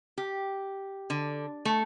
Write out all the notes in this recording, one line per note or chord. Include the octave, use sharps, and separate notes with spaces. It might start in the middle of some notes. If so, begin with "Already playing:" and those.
G4
D3
A3